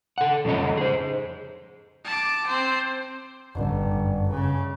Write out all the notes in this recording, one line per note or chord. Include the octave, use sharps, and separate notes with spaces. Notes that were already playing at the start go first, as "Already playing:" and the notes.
A4 F#5
F2 C#3 G3 C#4 D#5
G#4 C5
A5 D6
C4 C5
G1 F#2
C#3